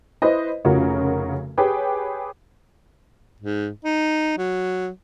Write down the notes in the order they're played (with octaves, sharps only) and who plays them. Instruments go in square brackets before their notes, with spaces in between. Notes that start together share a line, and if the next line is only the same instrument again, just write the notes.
[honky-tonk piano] E4 B4 C5 D#5
F1 C#3 C#4 F4 F#4 A#4
G4 G#4 B4 C#5 G5
[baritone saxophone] G#2
D#4
F#3